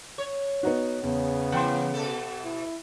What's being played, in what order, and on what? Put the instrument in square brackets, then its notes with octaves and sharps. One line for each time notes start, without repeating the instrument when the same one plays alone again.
[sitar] C#5
[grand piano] B3 D#4 F#4
[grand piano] E2 [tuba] C#3 [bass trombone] B3
[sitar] E3 [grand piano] F#5 G5 C6
[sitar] B2 A4
[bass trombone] E4